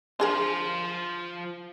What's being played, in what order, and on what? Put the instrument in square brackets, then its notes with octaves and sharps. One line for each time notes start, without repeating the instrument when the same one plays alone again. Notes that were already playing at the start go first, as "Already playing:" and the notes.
[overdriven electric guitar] F3 C5 [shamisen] D4 G#4 A#4